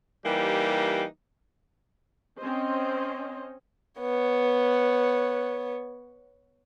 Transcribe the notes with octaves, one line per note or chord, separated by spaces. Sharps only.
E3 G3 A#3 D#4 G4
C4 C#4 C5 D#5
B3 C#5